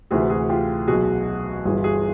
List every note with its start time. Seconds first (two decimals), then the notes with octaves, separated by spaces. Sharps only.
0.11 D2 C3 E3 F#4 G#4
0.30 F#4 G#4
0.49 F4 G4
0.88 B1 B2 F#4 G#4
1.65 G1 G2 E3 F#4 G#4
1.84 F#4 G#4